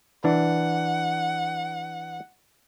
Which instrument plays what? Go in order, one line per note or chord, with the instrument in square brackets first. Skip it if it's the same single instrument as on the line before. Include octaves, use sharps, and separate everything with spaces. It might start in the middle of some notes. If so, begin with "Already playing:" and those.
[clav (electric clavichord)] E3 D4 [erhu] F#5